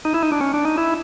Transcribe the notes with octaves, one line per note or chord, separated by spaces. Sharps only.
D#4
E4
D#4
D4
C#4
D4
D#4
E4